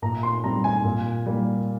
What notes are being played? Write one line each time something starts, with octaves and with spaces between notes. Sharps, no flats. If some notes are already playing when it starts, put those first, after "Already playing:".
A#2 A#5
C6
G3 C4 A#5
G#5
A#2
G3 A#3